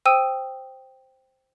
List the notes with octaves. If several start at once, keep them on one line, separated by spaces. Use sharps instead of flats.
C5 G5 D#6 E6 D#7